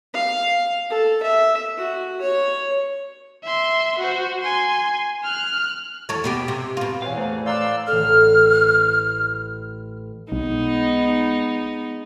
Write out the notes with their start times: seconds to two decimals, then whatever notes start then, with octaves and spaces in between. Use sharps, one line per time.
0.14 F5
0.90 A4
1.23 E5
1.77 F#4
2.21 C#5
3.43 E5 C6
3.98 F#4 C5
4.41 G#5 C6
5.23 F6 F#6
6.09 E2 A4 C#5
6.24 B2 B3 G4
6.48 C3
6.77 B2 F4
7.02 E2 B4 C#5 F5 G#5
7.17 A2 A3 C5 A#5
7.46 D5 F5 A#5 C6 E6 F#6
7.87 A1 A4 F6
10.32 B1 G#3 B3 D#4